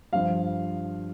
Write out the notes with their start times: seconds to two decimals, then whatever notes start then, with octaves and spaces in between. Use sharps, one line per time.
0.13 G2 F3 F5